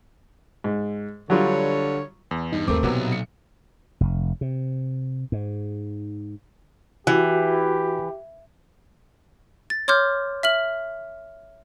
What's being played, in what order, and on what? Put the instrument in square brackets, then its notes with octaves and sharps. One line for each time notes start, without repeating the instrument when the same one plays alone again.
[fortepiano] G#2
[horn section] D3 C#5 [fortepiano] F#3 G3 F4
[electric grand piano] E2
[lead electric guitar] G2 [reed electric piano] D#4
[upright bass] D#2 [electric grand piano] A3 C4 [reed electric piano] A#4 D6
[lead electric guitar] B1 [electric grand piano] C3 F#3 B3 [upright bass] A#3
[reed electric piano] A#2
[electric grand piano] C#7
[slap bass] F1
C3
G#2
[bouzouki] E3 [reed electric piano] F#4 [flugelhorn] G4
[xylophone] A6
C#5 C6 D6 F6 G6
E5 F6 F#7